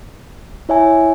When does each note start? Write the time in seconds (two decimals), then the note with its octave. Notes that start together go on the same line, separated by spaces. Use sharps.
0.69 E4 C#5 E5 G#5